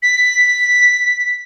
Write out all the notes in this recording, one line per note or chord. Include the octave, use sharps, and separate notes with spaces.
B6